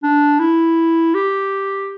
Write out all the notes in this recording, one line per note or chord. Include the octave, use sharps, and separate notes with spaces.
D4
E4
G4